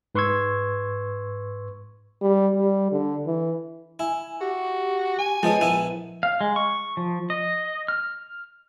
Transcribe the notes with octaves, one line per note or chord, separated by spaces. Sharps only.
G#2 B4 C6 C#6 E6 G#6
G3
G3
D3
E3
E4 G#5
F#4 G4
G#5
F3 F#3 G#3 B3
A#1 B3 E4 D#7
F5
G#3
C#6
F3
D#5
F6